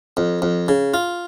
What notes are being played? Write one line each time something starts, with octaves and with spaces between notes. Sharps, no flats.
F2
F2
C#3
F4